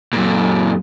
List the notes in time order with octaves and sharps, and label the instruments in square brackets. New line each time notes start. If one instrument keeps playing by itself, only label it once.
[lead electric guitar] F#2 A#2